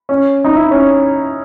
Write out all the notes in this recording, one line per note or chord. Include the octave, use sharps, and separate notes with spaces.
C#4
D#4
E4
C#4